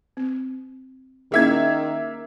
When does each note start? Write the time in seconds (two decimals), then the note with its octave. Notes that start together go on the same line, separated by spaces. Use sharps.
0.17 C4
1.32 D#3 A#3 C#4 E4 G#4 E5 G#6